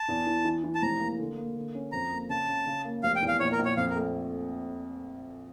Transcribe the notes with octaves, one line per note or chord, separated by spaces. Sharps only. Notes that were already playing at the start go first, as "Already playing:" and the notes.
Already playing: A5
E2
E3
E3
E3
A5
F1 A#5
A#3
D3
A#3
D3
C#4
F2 A#5
A#3
C#3 A5
C#3
C#3
A#3
F1 F5
G5
E2
F5
A#1 C#5
A#4
A#1
C#5
F2 F5
A#4
A3